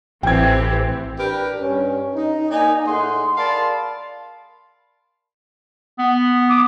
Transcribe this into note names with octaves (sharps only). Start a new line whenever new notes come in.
A1 E3 C4 G4 G5 G#6
D4 G4 A#4 B4
G2 C#4
D#4
A#3 D#4 D5 G#5
A2 G#4 D#5 F#5 C6
A#4 D5 F5 A5 B5 C6
B3
D6 D#6